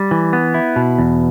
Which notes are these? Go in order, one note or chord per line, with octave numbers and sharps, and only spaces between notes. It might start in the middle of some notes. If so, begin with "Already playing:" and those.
Already playing: G3
E3
B3
E4
B2
E2